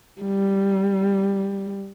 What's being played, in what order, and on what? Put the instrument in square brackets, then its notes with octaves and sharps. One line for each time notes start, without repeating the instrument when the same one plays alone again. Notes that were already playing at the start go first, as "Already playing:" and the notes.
[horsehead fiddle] G3